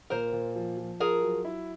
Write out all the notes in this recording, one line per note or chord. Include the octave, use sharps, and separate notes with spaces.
A#2 A#4 C5
A#2
F3
F3
F4 G#4 A#4
F#3
E4